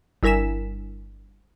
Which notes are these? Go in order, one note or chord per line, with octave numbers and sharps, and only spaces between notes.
G1 E4 A#4 G#5 B6 E7